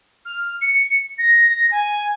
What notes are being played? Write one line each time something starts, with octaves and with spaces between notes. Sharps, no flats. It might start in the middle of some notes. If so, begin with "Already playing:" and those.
F6
C#7
A#6
G#5